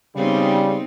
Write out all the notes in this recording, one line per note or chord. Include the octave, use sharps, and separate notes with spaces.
C#3 G3 B3 C4 D#4